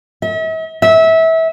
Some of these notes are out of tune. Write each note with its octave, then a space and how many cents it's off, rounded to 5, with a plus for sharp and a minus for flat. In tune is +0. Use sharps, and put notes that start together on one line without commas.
E5 -45
E5 -25